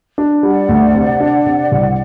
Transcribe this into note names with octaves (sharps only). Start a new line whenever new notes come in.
D4
G3 D5 F#5
D2
C3
D4
C3
C2